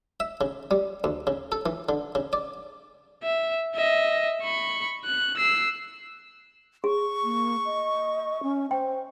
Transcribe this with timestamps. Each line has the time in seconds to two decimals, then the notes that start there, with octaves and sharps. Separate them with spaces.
0.20 E5
0.41 C#3
0.71 G3
1.04 D2
1.27 C#3
1.52 A4
1.66 E3
1.89 D3
2.15 C#3
2.33 D5
3.23 E5
3.75 D#5 E5
4.42 B5 C#6
5.05 F#6
5.37 E6 C7
6.84 G#4 C#6
7.24 A#3
7.65 D#5
8.43 C#4
8.71 C5 G5